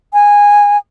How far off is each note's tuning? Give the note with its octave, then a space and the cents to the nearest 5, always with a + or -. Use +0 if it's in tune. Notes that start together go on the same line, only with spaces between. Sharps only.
G#5 -15